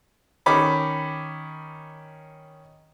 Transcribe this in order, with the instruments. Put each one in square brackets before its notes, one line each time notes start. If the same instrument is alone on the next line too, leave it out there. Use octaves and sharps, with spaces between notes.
[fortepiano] D#3 C#4 B5 D6